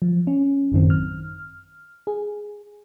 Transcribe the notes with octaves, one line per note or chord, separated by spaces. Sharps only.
F3
C#4
A1 F#2 D#3 C4
F6
G#4